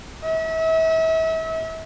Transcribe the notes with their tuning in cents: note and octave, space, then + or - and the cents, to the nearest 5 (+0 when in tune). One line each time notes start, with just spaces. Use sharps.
E5 -35